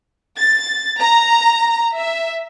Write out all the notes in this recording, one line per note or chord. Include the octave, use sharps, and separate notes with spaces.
A6
A#5
E5